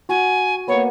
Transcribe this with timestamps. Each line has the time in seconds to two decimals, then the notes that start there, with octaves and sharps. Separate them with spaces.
0.09 F#4 G#5
0.68 A#3 B3 C#5